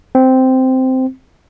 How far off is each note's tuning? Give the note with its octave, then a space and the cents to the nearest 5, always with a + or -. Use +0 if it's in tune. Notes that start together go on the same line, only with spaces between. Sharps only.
C4 -10